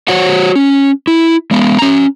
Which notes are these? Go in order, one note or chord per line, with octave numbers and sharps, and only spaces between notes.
F#4 C5 C#5 F#5
C#4
E4
G#3 B3
C#4 A#5